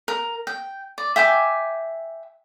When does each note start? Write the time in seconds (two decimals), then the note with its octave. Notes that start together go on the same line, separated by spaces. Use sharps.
0.08 A#4
0.47 G5
0.98 D5
1.16 E5 G5 G#5 D6